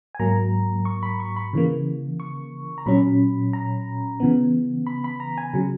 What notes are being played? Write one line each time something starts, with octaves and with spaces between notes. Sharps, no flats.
G#5
G#2 F#3 A#3 A#5
C#6
B5
C#6
B5
C#3 E3 A#3
C#6
A#5
A#2 F#3 C#4 B5
A#5
C#3 E3 B3
B5
B5
A#5
G#5
C#3 F#3